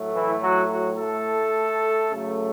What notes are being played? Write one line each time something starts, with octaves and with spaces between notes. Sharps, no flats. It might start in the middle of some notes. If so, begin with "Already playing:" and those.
Already playing: A2 F#3 A3
E3 E4
F#3 F#4
F#3 F#4
A3 A4
C#3 F#3 A3